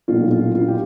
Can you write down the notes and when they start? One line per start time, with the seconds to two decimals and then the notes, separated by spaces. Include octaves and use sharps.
0.08 B1 A#2 F#3 A#3 F4
0.31 F4
0.55 F4
0.68 G4